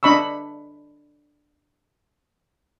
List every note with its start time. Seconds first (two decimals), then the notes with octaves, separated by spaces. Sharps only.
0.03 D4 D#5 B5 C#6 E6